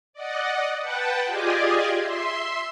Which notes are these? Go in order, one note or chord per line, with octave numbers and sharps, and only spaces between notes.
D5 D#5 F#5
B4 F#5 G5 A5
F4 G4 G#4 D5 D#5 G#5
E5 C6